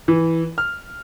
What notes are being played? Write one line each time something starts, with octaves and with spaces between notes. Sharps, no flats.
E3
F6